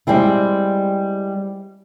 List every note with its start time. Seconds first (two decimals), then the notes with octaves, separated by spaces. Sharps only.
0.07 G3 G#3 C4 E4